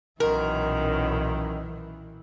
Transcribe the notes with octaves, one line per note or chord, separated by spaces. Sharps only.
B1 F#2 A#2 D#3 E3 A#4